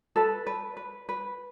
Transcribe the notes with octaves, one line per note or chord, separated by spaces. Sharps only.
A4 B4 A5
B4
B4
B4